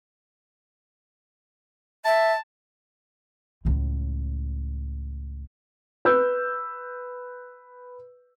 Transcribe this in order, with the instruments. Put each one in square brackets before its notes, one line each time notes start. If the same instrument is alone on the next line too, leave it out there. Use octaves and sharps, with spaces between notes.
[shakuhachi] E5 [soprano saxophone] A5
[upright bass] C#2 A2
[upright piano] B4 E6 G6